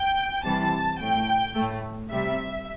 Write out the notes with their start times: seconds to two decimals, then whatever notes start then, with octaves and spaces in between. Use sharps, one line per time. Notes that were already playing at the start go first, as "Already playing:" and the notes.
Already playing: G5
0.44 C3 E3 G3 A5
0.99 A2 A3 G5
1.56 A2 A3
2.11 C3 G3 E5